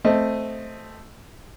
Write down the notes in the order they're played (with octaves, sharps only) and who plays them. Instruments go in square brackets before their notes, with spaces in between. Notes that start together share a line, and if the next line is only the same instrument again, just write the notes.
[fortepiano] A3 C4 D#5